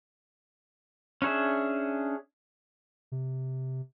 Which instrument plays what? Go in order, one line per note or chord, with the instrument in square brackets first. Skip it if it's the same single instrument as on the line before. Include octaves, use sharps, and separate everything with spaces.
[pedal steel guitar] C#4 D4 G#4 E5
[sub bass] C3